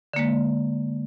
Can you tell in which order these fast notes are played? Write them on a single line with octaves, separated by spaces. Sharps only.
D3 A#3 G#3